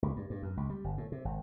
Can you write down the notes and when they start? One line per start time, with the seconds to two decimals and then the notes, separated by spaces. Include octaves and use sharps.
0.02 C#2
0.16 G2
0.30 G2
0.43 F#2
0.57 C#2
0.70 G3
0.84 G1
0.98 A2
1.12 C3
1.25 G#1